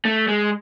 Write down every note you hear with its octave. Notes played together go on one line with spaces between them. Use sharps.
A3
G#3